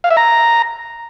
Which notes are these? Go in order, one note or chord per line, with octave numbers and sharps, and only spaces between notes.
F5
E5
A#5